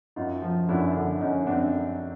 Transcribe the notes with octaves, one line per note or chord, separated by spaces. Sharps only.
F#2 D#4 F4
F3
F#2 D4 E4
D3
F#2 C#4 D#4
F#2 C4 D4